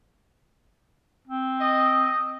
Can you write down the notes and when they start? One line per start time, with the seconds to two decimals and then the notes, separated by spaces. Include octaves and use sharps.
1.27 C4
1.61 D#5